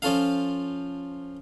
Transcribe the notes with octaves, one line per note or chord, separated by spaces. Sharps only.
F3 C#4 F4 A4 F5